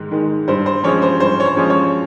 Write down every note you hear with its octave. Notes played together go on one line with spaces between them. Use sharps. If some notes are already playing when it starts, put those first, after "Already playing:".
Already playing: G#2 D#3 G#3
D#3 G#3
G2 C5
C5
F3 G#3 C#4 C#5
C5
G2 C5
C#5
C5
F3 G#3 C#4
C#5